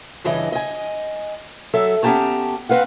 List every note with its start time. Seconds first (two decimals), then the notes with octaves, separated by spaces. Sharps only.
0.24 G2 C#3 E3 D#5
0.52 D#5 G#5
1.74 F#3 A4 E5
2.03 B3 C#4 G4 G5 A5 A#5
2.69 C4 B4 F5 F#5